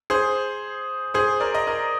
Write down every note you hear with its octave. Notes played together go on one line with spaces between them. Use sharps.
G#4 C5
G#4 C5
A#4 D5
D#5
A#4 D5